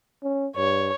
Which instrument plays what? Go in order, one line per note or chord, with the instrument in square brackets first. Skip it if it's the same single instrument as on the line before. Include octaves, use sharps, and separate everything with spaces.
[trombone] C#4
[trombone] G2 [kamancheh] C#5